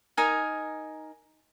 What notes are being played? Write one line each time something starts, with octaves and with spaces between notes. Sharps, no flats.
D#4 A#4 G#5